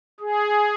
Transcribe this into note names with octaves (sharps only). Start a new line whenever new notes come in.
G#4